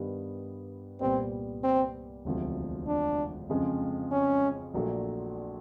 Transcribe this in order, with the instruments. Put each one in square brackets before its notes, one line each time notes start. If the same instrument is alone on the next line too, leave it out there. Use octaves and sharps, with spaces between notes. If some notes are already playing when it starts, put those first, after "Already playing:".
Already playing: [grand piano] G2 D#3 G3 B3
[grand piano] C2 A#2 G3 B3 [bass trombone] C4
[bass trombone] C4
[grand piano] E1 D2 C3 F3
[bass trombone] D4
[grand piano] F2 C#3 F3 G#3 C4
[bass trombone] C#4
[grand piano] A#1 A#2 F#3 A3 D4